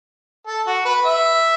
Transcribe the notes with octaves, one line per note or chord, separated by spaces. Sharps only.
A4
F#4
B4
E5